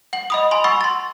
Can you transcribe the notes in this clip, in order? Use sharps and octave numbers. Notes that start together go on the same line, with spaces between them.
F#5 F#7
D#5 B5 D#6
G#5 B5 C6
F#5 B5 C#6 E6 A6
C6 A6